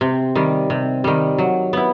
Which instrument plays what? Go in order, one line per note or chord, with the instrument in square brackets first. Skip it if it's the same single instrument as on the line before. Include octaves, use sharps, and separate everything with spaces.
[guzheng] C3
D#3 G3
C3
D#3 G3
F#3
B3 E4